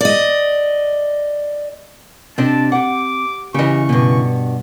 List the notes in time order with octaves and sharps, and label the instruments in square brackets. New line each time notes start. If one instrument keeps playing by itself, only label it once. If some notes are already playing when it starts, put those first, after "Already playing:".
[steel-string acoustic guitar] D5 D#5
[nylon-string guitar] C3 D4 D#5 [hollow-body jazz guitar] C4 [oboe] A5
[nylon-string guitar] G4 F#5 [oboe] D6
[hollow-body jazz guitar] C#3 E3 [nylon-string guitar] G4 D#5 [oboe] C#6
[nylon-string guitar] G2 B2